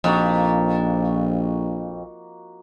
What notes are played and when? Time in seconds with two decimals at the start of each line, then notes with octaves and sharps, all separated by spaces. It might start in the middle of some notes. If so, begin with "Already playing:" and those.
0.04 A#1 F2 A#3 D#4 F#4